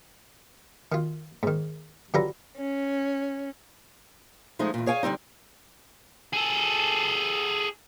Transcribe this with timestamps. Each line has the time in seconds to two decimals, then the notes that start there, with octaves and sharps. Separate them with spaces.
0.92 D#3 F4
1.43 G#2 D#3
2.14 D3 F#3 F4 G4 B4 A#5
2.57 C#4
4.59 F3 G#3 A3 D#4
4.74 E2 A#2
4.86 G#4 C#5 F5 G5 G#5
5.03 D3 G3 C4 D#4
6.33 G#4 A4